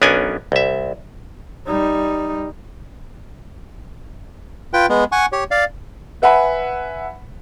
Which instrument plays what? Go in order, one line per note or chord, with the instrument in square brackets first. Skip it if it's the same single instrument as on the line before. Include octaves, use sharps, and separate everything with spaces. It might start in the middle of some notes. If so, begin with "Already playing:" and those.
[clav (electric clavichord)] B1 B3 C#4 D4 A#4 G#5
C2 E5
[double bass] G3 D#4
[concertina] F4 B4 G5
G#3 B3
F#5 G#5 C#6
G4 C#5
D5 F5
[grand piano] B4 E5 F#5 G#5 B5